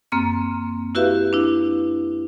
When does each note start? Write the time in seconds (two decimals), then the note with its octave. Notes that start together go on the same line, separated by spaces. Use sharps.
0.12 F#2 A#3 C4 F6
0.95 E4 F#4 G4 B4 E5 F5
1.33 D4 E4